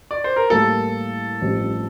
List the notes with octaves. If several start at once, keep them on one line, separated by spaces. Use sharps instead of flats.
D5
C5
A#4
A2 G3 A#3 A4
A1 G2 F3 C4 G4